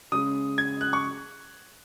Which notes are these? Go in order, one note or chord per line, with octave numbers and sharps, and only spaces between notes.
C#3 G#3 D#6
G#6
F#6
C#6